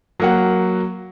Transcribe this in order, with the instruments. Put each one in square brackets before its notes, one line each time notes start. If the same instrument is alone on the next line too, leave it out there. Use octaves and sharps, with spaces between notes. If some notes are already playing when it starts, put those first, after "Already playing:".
[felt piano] F#3 A#3 F#5